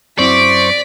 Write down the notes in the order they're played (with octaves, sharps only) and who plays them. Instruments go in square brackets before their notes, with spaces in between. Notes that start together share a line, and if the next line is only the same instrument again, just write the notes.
[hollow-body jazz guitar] F#2 C4 E4 [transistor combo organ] C5 C#6 [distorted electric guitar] D5 [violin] B6 D7